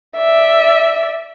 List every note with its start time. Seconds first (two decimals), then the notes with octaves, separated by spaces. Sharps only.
0.17 D5 E5